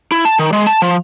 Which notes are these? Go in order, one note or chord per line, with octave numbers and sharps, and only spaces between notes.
E4
A5
D#3
G#3
A5
F3